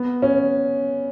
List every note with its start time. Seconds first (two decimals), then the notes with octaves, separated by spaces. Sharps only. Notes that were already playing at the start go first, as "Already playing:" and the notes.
Already playing: B3
0.22 C#4